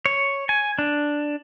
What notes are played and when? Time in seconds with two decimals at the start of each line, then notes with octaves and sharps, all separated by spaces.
0.06 C#5
0.49 G#5
0.79 D4